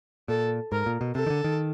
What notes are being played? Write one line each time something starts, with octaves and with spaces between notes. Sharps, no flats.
A#2 A4
G#2 A#4
A#2
B2
C3 A4
D#3
D3
D#3